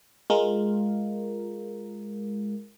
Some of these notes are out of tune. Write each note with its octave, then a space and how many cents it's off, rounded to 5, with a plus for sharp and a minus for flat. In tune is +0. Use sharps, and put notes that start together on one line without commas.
G#3 +0 F4 +10 A#4 +0